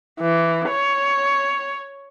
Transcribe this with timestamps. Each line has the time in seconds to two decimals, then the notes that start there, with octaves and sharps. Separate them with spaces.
0.20 E3
0.68 C#5